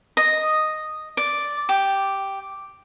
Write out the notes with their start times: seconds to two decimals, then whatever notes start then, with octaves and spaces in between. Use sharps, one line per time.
0.17 D#5
1.17 D5
1.69 G4